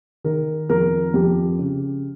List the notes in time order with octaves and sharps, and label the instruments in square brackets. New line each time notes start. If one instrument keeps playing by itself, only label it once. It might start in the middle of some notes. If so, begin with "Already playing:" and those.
[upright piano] D#3 A#4
F2 A#4
F2 G4
C#3